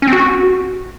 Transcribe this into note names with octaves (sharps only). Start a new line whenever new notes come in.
C#4
C4
F#4